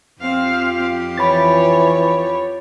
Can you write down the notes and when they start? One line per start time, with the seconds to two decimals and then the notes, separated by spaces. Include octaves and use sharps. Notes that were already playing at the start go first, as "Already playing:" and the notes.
0.21 F2 F3 C4 G4 F5
1.18 E3 C#5 B5 A6